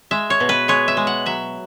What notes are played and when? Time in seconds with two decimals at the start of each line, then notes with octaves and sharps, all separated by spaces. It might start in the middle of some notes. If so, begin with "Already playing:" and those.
0.11 G#3 E5
0.30 C#5
0.40 B2
0.49 B4
0.68 G#3 C#5
0.88 E5
0.97 G#3
1.07 F#5
1.26 F#3 E5